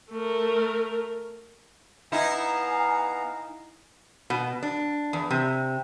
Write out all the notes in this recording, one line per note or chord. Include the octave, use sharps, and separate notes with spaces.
A3 A#4
B3 D#4 E4 F5 G#5 A#5
B2
D4
E2
C3